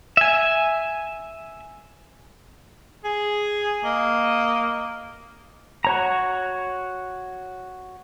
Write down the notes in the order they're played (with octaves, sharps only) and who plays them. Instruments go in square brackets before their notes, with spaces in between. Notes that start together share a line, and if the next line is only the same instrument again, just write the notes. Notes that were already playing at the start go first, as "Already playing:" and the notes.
[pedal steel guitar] E5 G#5
[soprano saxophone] G#4
[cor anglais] A#3 [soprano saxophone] D#5
[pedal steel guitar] F#4 C#5 A#5